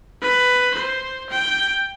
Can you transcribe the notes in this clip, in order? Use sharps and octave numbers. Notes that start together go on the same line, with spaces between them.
B4
C5
G5